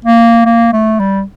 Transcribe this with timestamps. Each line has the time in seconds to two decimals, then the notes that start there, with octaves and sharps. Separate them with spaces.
0.05 A#3
0.46 A#3
0.73 A3
0.99 G3